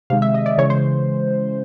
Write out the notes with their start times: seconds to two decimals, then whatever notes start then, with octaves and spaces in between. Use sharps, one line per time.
0.10 C3 D#3 G#3 F5
0.22 E5
0.34 D#5
0.46 D5
0.58 C#3 E3 G#3 C#5
0.70 C5